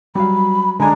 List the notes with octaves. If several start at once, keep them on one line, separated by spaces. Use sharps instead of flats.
F#3 G3 F5 B5
D3 G#3 D4 G#5 A#5